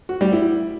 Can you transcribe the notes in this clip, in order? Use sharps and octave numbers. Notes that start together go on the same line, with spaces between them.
F#4
G3
E4